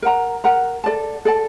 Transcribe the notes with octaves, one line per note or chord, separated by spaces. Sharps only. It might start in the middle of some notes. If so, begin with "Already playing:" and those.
A#4 F#5 A#5
A#4 F#5 A#5
A4 D5 A5
A4 D5 A5